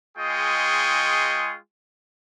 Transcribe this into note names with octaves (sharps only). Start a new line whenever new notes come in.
G#3 F4 G#4 D#5 G5 C#6